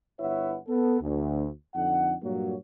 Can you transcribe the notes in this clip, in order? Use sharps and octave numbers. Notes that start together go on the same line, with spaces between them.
G1 E4 B4 C#5 E5 F#5
B3 A4
D2
F2 D3 D#4 F#5
G2 A#2 F#3 A#3 F#4 C#5